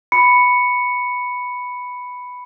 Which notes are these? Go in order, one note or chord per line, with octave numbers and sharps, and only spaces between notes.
B5 C#7